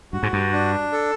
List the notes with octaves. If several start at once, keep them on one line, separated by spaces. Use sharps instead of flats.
G2 F#4
G#2
G2
D4
A4